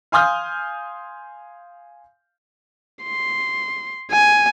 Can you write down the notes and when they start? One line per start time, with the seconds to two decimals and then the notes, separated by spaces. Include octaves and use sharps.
0.12 F5 G#5 C6 D#6 F6 G6
3.04 C6
4.11 G#5